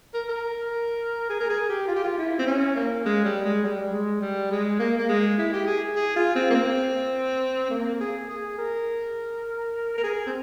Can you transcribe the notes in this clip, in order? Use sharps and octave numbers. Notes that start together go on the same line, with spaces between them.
A#4
A#4
G#4
A#4
G#4
G4
F4
G4
F4
E4
C4
C#4
A#3
G#3
G3
G#3
G3
G#3
G3
G#3
A#3
A#3
G#3
E4
G4
G#4
G#4
F4
C4
A#3
C4
A#3
G#4
G#4
A#4
A#4
G#4
C4